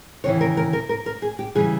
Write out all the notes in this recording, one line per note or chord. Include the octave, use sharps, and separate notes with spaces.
D#2 C#3 E3 C#5
A#4
A#4
A#4
A#4
A#4
G#4
G4
C#3 E3 G3 G#4